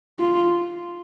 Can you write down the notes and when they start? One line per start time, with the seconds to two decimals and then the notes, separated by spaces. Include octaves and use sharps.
0.19 F4